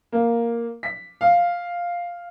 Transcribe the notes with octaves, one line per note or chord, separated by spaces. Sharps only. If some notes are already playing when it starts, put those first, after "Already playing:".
A#3
B6
F5